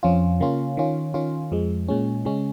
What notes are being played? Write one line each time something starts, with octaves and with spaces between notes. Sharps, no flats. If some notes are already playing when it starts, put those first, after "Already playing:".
F2 F3 C#4 F4
C#3 A#3 C#4 F4
D#3 C#4 F4
D#3 C#4 F4
F2 F3 G#3
A#2 G#3 C#4
C#3 G#3 C#4